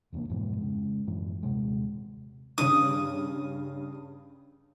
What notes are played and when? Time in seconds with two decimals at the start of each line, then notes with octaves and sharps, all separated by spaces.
0.13 F1 E2 D3 A#3
0.29 F2 G#2 B2 E3
0.57 C#3 G#3
1.07 F#2 A2 E3
1.43 D#1 D#2 C3 G#3
2.58 G2 C#3 D#6